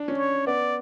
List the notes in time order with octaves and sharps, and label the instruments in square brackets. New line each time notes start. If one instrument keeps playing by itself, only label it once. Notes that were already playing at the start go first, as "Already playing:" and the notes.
Already playing: [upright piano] D4
C#4
[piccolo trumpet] C#5
[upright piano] B3 [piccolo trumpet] D5